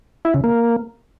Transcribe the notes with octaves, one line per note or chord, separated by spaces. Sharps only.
E4
C#3
A#3